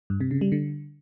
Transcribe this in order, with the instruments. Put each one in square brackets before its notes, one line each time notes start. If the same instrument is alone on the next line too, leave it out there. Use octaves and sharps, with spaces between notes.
[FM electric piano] G2
C3
C#3
G3
D3